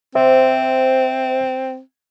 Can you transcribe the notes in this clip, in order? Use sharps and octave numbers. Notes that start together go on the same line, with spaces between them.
C4 C5 E5